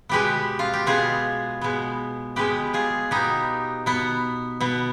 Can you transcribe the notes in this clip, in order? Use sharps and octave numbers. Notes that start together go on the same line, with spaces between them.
B2 G#3 B3 G4 B4
F4
G4
B2 G#3 B3 F4 G#4
B2 G#3 B3
B2 G#3 B3 G4 B4
F4 G#4
B2 B3 D#4 G4
B2 B3
B2 B3